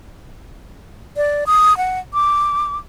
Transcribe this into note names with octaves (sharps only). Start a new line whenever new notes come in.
D5
D#6
F#5
D6